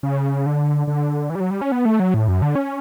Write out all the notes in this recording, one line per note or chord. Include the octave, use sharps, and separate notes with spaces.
C#3
D3
D3
E3
G3
F#3
G3
C#4
B3
A3
F#3
A2
F#2
D3
C#4